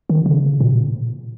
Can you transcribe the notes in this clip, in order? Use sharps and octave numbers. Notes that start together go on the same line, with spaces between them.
D#3
C#3
A#2